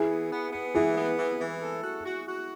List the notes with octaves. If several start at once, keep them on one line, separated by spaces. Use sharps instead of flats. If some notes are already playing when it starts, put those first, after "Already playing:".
Already playing: E3 E4 G#4
B3
B3
B3
E3 E4 G#4
B3
E3
E3
A4
F#4
F#4
F#4